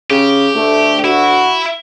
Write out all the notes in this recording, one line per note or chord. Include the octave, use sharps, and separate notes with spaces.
C#3 G4
D2 A3
E4 F#4